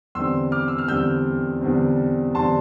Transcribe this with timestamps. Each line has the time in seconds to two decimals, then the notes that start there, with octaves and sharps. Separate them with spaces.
0.15 E2 D3 G3 C4 C6 E6
0.52 D6 F6
0.68 E6
0.78 F6
0.88 E2 D3 G3 C4 E6 G6
1.61 E2 D3 G3 C4
2.35 E2 D3 G3 C4 A5 C6